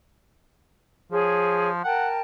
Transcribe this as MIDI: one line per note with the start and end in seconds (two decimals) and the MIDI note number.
1.12 1.83 53
1.12 1.70 68
1.12 1.70 73
1.84 2.22 70
1.84 2.08 78
1.84 2.22 79
1.84 2.22 81